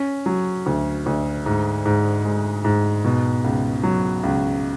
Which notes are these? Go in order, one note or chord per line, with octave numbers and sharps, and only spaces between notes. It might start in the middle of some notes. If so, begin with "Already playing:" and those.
Already playing: C#4
F#3
D2
D2
G#2
G#2
G#3
G#2
B2
C#2
F#3
C#2